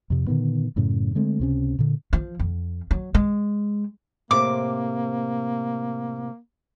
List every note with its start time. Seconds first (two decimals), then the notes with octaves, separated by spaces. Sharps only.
0.10 F2 C3
0.27 A#2 D3 D#3 B3
0.76 F#2 A2 C#3
1.15 D3 G#3 A3 C4
1.40 C#2 C3 C#4
1.79 A#2 D3
2.13 F3
2.39 F2
2.91 F#3
3.14 G#3
4.31 A2 C3 A#3 C4 D6